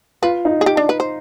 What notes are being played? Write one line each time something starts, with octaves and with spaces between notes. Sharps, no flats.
F4 B4
D#4
G#4
G4
D4
B4
C5